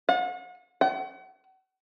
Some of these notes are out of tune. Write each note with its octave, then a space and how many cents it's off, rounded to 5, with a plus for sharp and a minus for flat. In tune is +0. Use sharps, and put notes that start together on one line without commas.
F#5 -40
F#5 +40